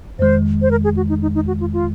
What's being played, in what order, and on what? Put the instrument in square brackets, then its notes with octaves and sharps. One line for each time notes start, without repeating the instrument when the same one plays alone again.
[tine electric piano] F2 D#3 G#3 [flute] C5
[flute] C5
A#4
G#4
F#4
D#4
D#4
D#4
F#4
F4
F4